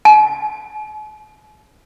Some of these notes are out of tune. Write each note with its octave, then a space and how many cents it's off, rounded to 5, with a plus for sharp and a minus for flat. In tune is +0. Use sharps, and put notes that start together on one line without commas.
G#5 +45